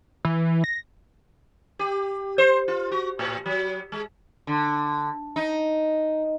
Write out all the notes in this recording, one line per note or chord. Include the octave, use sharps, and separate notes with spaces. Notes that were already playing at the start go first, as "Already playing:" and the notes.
E3
A#6
G4
C5
F4
F#4
A2
F#3
G#3
D3
D#4